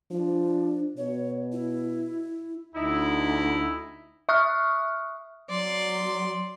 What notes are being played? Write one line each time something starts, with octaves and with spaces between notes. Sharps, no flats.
F3 D4
B2 C#5
E4
D2 D#4 E4
E5 C#6 D#6 F6 F#6
F#3 D5 C6